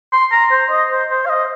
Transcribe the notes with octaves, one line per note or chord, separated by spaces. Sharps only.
C6
A#5
C5
D#5
C5
C5
F5
D#5